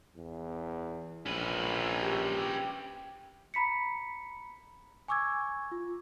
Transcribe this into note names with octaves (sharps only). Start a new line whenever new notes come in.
E2
A#1 C#4 B4
G4
A#5 B5 B6 C#7
G#5 C#6 D6 E6 G#6
F4